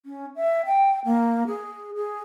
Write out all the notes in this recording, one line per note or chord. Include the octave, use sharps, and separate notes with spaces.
C#4
E5
G5
A#3
G#4
G#4